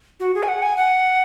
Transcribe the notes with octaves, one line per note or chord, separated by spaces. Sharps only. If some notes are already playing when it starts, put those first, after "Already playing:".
F#4
G#4
G#5
F#5
G#5
F#5